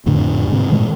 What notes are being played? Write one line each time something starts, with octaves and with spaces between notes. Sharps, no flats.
F2 A2 D3
G#2 C3
A#2 D#3 G#3 A3